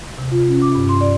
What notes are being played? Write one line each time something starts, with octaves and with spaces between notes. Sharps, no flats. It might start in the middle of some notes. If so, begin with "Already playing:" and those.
C3
F4
C#4
D6
G2
C6
D5